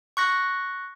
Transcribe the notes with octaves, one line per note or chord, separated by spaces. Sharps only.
C#6 F#6 A#6